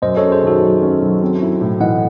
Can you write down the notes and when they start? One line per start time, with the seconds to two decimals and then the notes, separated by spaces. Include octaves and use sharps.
0.02 F#2 C5 D#5
0.17 C#4 A4 C#5
0.32 G#4 C5
0.43 D#3 F#4 A4
0.62 F#3
0.82 C#4
1.01 F#3
1.22 C4
1.42 E4
1.61 A2
1.80 E3 D#5 F#5